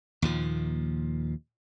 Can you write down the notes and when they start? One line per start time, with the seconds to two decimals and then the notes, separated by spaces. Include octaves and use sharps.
0.22 D#2 A#2 F3